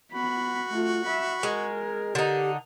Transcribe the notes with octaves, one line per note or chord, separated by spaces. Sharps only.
B3 F#4 B5
A3 F4
E5 B5
G#3 A#4
D3 D#4 G4